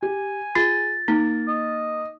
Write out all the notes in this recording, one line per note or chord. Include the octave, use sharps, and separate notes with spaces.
G4 G#5
F4 G#4 A6
A#3 D#4
D#5